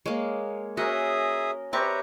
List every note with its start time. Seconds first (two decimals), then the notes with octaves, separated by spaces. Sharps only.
0.06 G#3 A#3 C#5
0.77 C#4 F#4 G#4 A#4 D#5 E5 D#6
1.73 C4 G4 B4 C#5 D5 E5 A#5 C#6